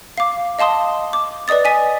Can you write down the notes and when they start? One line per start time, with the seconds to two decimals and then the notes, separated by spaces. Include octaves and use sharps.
0.18 F5 D6
0.59 D#5 F5 A5 C6 D#6
1.13 D6
1.48 B4 D5 D#5 D#6 A6
1.64 D#5 G#5 B6